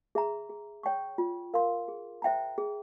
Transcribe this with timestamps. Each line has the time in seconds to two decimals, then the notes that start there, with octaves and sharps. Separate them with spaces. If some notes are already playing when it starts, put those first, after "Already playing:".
0.15 G#4 E5 A#5
0.49 G#4
0.83 C#5 G5 C#6
1.18 F4
1.54 A#4 F5 C6
1.88 G#4
2.22 C5 E5 G5 A#5
2.58 G#4